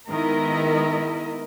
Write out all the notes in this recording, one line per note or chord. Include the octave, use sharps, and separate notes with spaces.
D#3 G#3 B3 E4 A#4 D#5